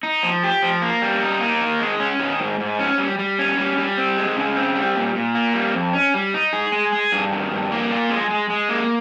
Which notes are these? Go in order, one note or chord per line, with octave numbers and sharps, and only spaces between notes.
D#4
F3
G4
F3
A#3
G3
D#4
A#3
D#3
G#3
C#4
D#3
G#2
G#2
C#4
G3
G3
C#4
G3
G3
C4
G#3
C#3
C4
G3
A#2
A#2
A#3
G3
F2
C#4
G3
D#4
G#4
G#3
G#4
G2
D#3
G2
A#3
F4
G#3
G#3
G#3
A#3